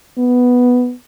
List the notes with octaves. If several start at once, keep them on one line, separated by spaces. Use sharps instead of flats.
B3